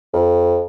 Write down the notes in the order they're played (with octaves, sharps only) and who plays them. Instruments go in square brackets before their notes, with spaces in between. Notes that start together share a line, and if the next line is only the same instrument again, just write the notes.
[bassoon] F2